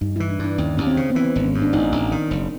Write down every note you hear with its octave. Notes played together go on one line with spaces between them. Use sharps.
G2 D#4
E3 E4
D4
G2
D4
D#2 C#4
D#2 C#4
C4
C#3
B3
E3 C4
G#1
C#4
G2
D4
A1 D#4
A1
D#3
F#1